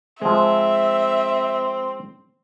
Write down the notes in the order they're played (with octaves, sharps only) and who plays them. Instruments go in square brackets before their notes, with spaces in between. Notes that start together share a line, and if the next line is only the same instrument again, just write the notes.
[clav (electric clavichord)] F3 G#3 [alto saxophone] C4 [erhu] E5